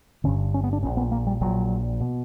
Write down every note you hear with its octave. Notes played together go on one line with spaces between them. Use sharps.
G1 G2 D3 C#4
C#4
B3
D4
A#1 A#2 C#4
B3
A#3
G3
A#1 A#2 F#3
B2